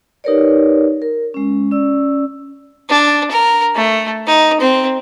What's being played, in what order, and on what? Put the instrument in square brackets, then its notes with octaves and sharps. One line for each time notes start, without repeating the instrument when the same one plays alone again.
[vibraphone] D#4 G4 A#4 B4 C#5 D5
A#4
G#3 C#4
C#4 D5 E6
[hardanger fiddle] D4
A#4
A3
D#4
C4